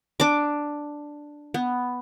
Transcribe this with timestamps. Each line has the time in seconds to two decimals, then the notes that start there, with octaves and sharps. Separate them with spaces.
0.20 D4 D6
1.54 B3